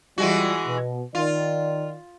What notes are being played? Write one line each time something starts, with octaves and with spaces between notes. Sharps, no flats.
E3 G3 G#3 F4 F#4
B2
D#3 F4 D5